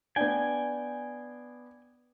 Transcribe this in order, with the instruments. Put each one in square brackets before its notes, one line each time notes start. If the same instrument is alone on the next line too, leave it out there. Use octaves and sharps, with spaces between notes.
[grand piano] B3 D4 [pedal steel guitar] G5 G#5